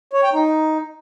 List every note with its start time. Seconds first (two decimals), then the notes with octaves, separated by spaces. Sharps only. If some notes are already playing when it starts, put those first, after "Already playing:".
0.13 C#5
0.23 G5
0.33 D#4